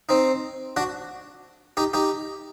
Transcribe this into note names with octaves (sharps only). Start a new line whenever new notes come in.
C4 D#4
D4 F#4
D#4 G4
D#4 G4